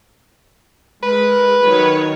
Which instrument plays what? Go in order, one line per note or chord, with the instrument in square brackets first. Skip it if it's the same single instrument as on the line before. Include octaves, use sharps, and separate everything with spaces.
[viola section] G#3 A#4 [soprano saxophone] B4
[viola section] D#3 F#3 C#5